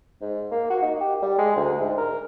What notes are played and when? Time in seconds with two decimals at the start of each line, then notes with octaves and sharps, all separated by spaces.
0.21 G#2
0.51 A#3
0.70 F#4
0.82 D#4
1.00 G4
1.22 G3
1.38 G#3
1.56 D2
1.80 G#2
1.97 A#4